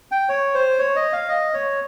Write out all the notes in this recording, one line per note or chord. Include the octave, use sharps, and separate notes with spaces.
G5
C#5
C5
C#5
D#5
F5
D#5
C#5